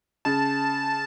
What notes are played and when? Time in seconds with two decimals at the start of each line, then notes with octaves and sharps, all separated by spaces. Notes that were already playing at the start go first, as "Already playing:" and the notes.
0.25 C#3 A5